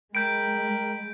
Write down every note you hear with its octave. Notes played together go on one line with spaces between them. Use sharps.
G#3 A#4 G5 B5 G6 D7